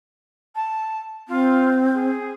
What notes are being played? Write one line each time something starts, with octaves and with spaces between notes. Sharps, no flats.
A5
C4 F4
G#4